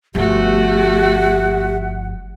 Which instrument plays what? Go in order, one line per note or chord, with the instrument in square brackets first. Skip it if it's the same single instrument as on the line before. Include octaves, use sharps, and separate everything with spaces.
[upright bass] G1 F3 [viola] A3 F#4 [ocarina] G4 [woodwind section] E5 F#5